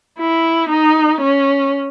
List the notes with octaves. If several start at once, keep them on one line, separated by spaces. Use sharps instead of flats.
E4
D#4
C#4